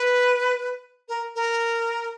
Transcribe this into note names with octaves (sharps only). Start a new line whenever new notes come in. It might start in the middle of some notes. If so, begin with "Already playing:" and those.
Already playing: B4
A#4
A#4